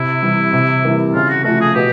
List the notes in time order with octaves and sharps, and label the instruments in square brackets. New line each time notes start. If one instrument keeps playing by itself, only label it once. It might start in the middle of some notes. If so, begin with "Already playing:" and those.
Already playing: [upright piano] C3 [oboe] E4
[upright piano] E3 G3
C3
E3 G3 A#3
[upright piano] C#3 [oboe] F4
[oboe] F#4
[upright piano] F3 A3 [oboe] F#4
[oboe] G#4
[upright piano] B2 [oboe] G4